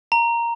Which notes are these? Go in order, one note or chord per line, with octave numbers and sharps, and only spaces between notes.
A#5